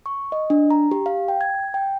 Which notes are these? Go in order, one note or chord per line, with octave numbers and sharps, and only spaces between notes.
C#6
D#5
D4
A#5
G4
F5
G5
G#6
G5